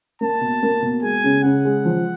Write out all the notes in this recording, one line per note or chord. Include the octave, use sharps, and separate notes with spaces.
A#3 A5
B2
A#3
B2
G#3 G#5
C#3
C#3 F#5
G#3
F3